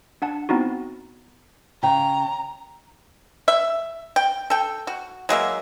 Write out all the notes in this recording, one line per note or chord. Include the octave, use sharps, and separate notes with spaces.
D4 F#5 A5
B3 C4 D#4 E4 F#4
C#3 G5 A#5
E5
G5
A4 G5
F#4
F#3 G#3 A#3 E5